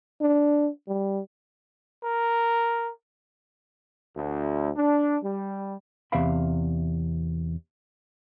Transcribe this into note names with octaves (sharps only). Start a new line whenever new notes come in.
D4
G3
A#4
D2
D4
G3
E2 C3 E5 F5 B5